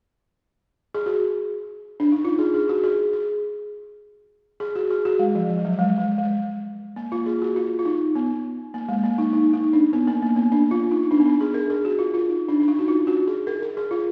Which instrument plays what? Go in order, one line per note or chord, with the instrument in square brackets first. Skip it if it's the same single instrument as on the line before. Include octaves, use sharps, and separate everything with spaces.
[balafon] G#4
F#4
D4
D#4
F4
G#4
G#4
F#4
G#4
G#4
G#4
F#4
G#4
F#4
G#3
F3
F3
F#3
G#3
G#3
G#3
A#3
F4
G#4
F#4
F4
F4
D#4
B3
A#3
G#3
A#3
D#4
D#4
D#4
D4
B3
A#3
A#3
B3
D4
F4
D#4
D4
B3
D4
G#4
A#4
G#4
F#4
F4
F4
D#4
D4
D4
D#4
F#4
F4
F#4
G#4
A#4
A#4
G#4
F4